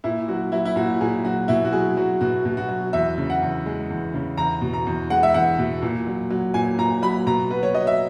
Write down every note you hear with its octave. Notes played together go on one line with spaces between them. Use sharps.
A#2 E4
F#3 F#4
F#3 E4
E4
A#2 F#4
A#2 G#4
F#3 F#4
B2 E4
F#4
F#3 G#4
F#3 F#4
B2 F#4
B2
F#4
F#3
E2 E5
C#3
F#5
E2
G#3
E2
C#3
E2 A#5
B2
A#5
E2
G#3 F#5
E5
E2 F#5
B2
A#2
F#3
F#3
A#2 G#5
A#2 A#5
F#3 B5
B2 A#5
F#3 B4
C#5
F#3 D#5
E5